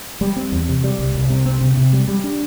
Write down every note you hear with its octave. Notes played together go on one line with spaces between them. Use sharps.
G3
C4
E2
C3
G3
C2
C2
C3
C4
C3
C3
G3
G3
D4